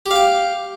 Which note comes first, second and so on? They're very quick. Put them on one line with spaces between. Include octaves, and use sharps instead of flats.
G4 F5 G5